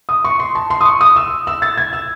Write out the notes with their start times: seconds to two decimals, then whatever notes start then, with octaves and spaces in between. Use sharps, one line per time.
0.09 D#6
0.24 C#6
0.40 C6
0.55 A5
0.70 C6
0.81 D#6
0.85 C#6
1.01 D#6
1.16 E6
1.47 E6
1.62 A6
1.78 G#6
1.93 E6